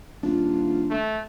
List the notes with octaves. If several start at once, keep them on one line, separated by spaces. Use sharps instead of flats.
D#1 D4 F4
A3